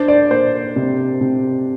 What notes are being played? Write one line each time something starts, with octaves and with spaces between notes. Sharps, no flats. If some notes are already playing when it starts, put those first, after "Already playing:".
Already playing: D4 C5
D5
A#3 C5
C3
C3